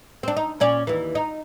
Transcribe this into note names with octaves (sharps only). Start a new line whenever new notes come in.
C4 D4
D#4
A#2 C#4 D5
D#2 E3
D#4